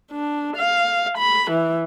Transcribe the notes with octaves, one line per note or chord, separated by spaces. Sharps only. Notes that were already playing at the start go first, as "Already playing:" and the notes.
D4
F5
B5
E3